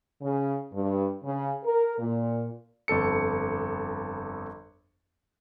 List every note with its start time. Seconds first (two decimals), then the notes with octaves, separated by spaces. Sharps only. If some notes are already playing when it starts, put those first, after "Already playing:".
0.22 C#3
0.74 G2
1.24 C#3
1.65 A#4
1.98 A#2
2.88 G1 F2 A4 C#7